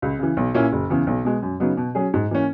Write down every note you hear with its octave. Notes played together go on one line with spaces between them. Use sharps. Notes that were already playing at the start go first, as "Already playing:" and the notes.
C#2
C#3 E3
B1
A#2 A#3 C#4 E4
F#1
E2 C#3 E3
B1
B2 G#3
F#2
C#3 F#3 B3 D#4
B2
F#3 C#4 G#4
G#2
E3 A#3 C#4